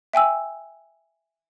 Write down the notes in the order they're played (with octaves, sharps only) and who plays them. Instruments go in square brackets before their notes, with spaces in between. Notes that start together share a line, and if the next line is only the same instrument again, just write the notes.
[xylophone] E5 G5 G#5 E6